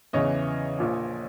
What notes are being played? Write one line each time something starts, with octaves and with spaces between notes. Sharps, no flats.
E2 C#3 E3 C#5 D#5
A#1 A#2 F3